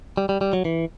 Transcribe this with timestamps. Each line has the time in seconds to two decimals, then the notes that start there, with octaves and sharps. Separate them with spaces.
0.17 G3
0.29 G3
0.41 G3
0.53 F#3
0.65 E3